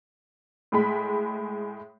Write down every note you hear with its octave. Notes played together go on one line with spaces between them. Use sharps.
A2 G#3 B5